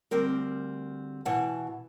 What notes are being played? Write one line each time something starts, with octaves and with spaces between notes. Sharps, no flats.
D2 G3 C4 A#4
B2 E3 F#5 A5